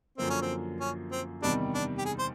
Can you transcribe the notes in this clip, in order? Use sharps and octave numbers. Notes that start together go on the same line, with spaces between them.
F#2 D3 F3 A#3 C4
C#4
C4
C#4
C4
E2 C3 D#3 G3 D4
D4
G4
G#4
C5